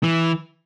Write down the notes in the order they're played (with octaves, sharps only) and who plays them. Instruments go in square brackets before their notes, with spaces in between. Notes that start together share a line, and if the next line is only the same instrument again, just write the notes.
[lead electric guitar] E3